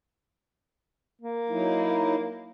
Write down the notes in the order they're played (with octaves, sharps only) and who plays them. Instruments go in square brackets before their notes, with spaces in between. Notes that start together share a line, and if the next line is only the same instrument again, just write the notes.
[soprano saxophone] A#3
[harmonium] F#3 D#4 E4